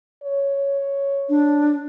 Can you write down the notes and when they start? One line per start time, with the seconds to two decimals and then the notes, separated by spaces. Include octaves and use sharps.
0.23 C#5
1.29 D4